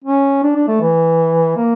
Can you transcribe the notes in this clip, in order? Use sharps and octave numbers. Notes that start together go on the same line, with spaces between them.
C#4
D4
D4
A3
E3
A#3